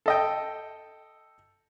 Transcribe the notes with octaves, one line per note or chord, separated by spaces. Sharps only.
A4 D#5 G5